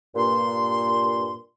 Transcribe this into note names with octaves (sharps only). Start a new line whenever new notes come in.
G2 A#2 C6